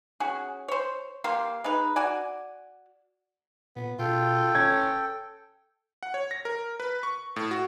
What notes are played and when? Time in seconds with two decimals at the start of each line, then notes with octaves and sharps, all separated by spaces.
0.20 C#4 F#4 G#4
0.68 C5 C#5
1.24 A#3 G4 F5 C6
1.64 G#3 D#4 B4
1.96 F#4 D5 G#5
3.76 A#2 B3
3.99 B2 F4 A4 G5
4.55 F1 C#4 G#6
6.03 F#5
6.14 C#5
6.31 A#6
6.45 A#4
6.80 B4
7.03 C#6
7.36 A2
7.51 F#4